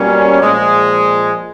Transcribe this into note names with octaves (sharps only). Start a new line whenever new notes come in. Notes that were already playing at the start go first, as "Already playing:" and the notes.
Already playing: B2 G3 A#3 C#4
A#2 F3 G#3